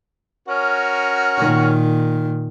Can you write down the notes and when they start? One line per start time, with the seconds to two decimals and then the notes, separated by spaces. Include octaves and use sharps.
0.48 C#4 F#4 A#4
1.38 A#2 D#3